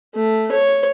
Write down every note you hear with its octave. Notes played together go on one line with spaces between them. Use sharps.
A3
C#5